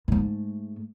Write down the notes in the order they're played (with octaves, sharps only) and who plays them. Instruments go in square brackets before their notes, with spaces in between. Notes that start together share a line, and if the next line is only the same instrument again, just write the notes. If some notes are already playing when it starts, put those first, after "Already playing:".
[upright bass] G#2 A3